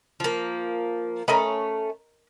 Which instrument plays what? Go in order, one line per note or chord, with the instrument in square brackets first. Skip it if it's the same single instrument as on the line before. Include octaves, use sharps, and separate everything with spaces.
[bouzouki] F3 A#3
[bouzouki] A3 C#4 [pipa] A#4 D#5 B5